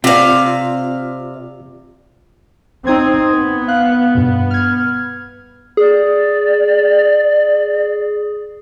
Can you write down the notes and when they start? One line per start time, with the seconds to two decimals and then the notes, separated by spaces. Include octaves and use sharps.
0.04 C3 C4 F4 D5 F5
2.87 C4 D#4 D#6 G#6
3.33 B3
3.68 F5 F#6
4.15 G2 B2
4.51 F6 G#6
5.77 G#4 D5